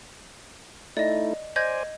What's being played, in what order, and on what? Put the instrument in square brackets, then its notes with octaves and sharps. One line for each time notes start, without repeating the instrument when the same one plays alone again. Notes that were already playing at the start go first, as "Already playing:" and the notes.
[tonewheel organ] A3 D#4 E4 [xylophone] D5 D#5
[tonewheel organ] C5 D5 G#5 [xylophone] D#5 G6 G#6